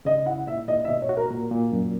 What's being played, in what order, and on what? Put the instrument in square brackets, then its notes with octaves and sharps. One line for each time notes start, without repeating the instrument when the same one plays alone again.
[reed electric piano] C#3 [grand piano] D#5
[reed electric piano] E4 [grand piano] F#5
[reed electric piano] A#2 [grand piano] E5
[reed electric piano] A#2 [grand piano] D#5
[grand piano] E5
[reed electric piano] B2 [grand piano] D#5
[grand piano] C#5
[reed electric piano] F#4
[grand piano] A#4
[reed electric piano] A#2
A#2
F#2